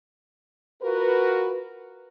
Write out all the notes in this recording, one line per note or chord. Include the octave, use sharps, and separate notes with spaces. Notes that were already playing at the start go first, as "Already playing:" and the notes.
F4 F#4 A#4 B4